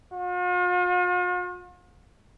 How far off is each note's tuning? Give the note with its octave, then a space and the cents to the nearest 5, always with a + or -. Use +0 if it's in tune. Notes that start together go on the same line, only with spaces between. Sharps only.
F4 +45